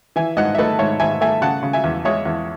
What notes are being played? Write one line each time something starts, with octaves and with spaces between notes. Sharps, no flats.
E3 E5 G#5
G#2 D#5 F#5
E5
A3 B4 D#5
G#2 C#5 E5
G#2 E5 G#5
A3 E5 G#5
C#3 F#5 A5
C#3
E5 G#5
E2
G#3 C#5 E5
E2